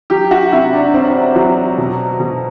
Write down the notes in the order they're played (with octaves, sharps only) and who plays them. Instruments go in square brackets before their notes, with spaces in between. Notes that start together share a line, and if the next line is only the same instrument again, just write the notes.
[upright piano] F#3 G4
F#4
C3 E4
D4
E1 C4
F#3
B2
B2